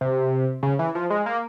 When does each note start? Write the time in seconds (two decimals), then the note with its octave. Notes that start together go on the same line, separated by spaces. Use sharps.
0.01 C3
0.63 C#3
0.79 E3
0.95 F3
1.10 G#3
1.26 A#3